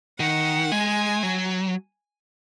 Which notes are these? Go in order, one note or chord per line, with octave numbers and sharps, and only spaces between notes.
D#3 F#5
G#3 G#5
F#3